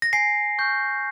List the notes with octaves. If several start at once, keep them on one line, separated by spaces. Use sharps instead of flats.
A#6
G#5 C7
C#6 F6 G6